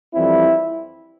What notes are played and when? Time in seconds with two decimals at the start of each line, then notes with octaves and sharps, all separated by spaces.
0.14 F2 E3 G3 C4 E4